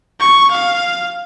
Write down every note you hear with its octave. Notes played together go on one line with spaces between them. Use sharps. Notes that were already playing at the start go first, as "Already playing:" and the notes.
C#6
F5